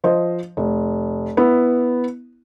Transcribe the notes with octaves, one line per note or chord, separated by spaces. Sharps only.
F3 C5 D#5
F1
B3 E4